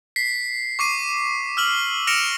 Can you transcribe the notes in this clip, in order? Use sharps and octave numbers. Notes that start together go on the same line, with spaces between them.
B6 C7
C#6 D6 C7 D#7
E6 F6 F#7
F6 A#6 C#7 D7 E7 F7